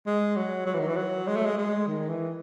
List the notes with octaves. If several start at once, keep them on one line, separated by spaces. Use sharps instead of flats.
G#3
F#3
F#3
E3
D#3
E3
F#3
G#3
A3
G#3
G#3
D#3
E3